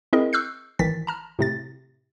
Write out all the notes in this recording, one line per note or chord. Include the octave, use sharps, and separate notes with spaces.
C4 E4 G#4 A#4 D#5
C#6 E6 F#6 G6 C7
G#1 D#3 E3 A6 B6
A5 A#5 F6
A2 C3 A6